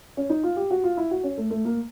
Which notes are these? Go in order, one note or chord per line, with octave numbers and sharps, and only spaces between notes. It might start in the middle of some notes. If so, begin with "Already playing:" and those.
C#4
D#4
F4
G4
F#4
F4
E4
F#4
C#4
A3
A3
A#3